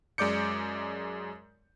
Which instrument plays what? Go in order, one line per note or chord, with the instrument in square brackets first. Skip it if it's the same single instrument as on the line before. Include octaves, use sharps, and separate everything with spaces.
[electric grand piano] F#2 G#3 D5 D6 G6 C#7